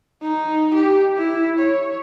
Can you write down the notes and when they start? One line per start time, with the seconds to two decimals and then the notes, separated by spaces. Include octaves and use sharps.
0.22 D#4
0.74 G4
1.17 E4
1.59 C#5